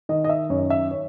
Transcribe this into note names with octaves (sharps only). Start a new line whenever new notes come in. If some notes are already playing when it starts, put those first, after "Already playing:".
D#3 D#5
D#5
E5
F#2 C#5
E5
C#5